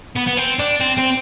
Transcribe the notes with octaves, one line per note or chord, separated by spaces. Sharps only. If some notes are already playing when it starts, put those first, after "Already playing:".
B3
B3
C4
D4
C4
C4